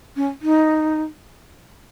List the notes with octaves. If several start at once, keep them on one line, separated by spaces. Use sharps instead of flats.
C#4
D#4